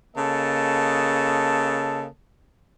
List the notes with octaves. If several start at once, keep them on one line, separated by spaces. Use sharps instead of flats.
C#3 A#3 A4 D#5 A5